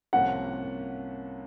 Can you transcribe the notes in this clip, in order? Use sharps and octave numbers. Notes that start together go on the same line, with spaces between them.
C2 C3 F3 A#3 C#4 F#5